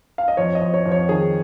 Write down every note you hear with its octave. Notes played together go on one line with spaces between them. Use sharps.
F5
D#5
F2 C#5
D#5
F2
C#5
F2
C#5
D#3 G#4